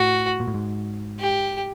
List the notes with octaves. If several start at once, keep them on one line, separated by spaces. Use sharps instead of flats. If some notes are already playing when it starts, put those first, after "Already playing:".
Already playing: A2 F#4
A#2
A2
G#2
G4